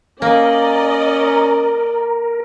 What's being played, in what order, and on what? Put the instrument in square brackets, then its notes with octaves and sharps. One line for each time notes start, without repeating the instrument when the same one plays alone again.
[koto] A#3 [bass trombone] C#4 [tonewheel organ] A#4 [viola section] D5 D#5